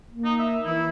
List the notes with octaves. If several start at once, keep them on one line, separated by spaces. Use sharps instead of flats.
A#3
D#4
E5
E3 E4